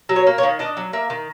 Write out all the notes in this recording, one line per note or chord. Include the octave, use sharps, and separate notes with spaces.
F#3
C#5
A#3
C#5
D#3
D4 D#5
F#3
A#3 E5
D#3